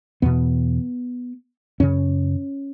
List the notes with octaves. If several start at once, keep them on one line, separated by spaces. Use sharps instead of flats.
E2 B2 B3
F#2 C#3 C#4